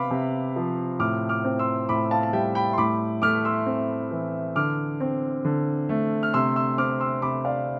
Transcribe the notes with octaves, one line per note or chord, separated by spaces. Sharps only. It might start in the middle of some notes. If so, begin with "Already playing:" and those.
Already playing: C3 B3 F5 B5 D6
C3
F3
A2 D6 F6
D6 F6
C4
C6 E6
A2 B5 D6
F5 A5
A5
G3 E5 G5
G5 B5
C6
A2 B5 D6
A3 D6 F6
C6 E6
C4
E3
D3 D6 F6
C4
D3
A3
F6
C3 C6 E6
C6 E6
C4 D6 F6
C6 E6
C3 B5 D6
D5 F5